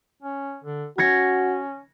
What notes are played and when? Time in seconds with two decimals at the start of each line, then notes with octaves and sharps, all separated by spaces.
0.23 C#4
0.64 D3
0.98 C#4 F#4 G#6 A#6 C#7